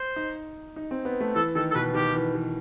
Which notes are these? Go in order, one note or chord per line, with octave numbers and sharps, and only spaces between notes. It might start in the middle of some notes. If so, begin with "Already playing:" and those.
Already playing: C5
D#4
D#4
C4
B3
A3
E3 A4
D#3 A4
A4
B2 B4
D#3 G4
E3
E3